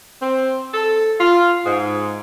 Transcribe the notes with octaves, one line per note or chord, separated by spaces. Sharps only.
C4
A4
F4
G#2